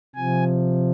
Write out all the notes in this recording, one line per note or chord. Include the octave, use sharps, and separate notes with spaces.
C3 F3 G#5